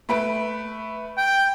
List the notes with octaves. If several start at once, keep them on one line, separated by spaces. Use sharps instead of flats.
A3 B4 D7
G5